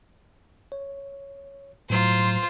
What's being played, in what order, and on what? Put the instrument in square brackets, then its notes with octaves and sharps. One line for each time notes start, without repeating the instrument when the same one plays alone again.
[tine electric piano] C#5
[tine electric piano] A2 F#3 A#5 [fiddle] F4 C5